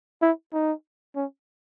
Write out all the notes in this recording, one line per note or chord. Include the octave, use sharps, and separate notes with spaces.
E4
D#4
C#4